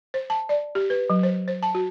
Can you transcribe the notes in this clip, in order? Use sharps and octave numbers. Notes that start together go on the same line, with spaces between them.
C5
A5
D5
G4
B4
F#3
C5
C5
A5
F#4